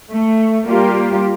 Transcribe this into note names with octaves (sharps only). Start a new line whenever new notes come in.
A3
G3 A#3 F4 G4